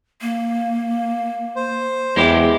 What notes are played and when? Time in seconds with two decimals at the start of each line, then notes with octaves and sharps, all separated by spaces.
0.21 A#3
1.56 C5
2.16 E2 G#3 E4 G4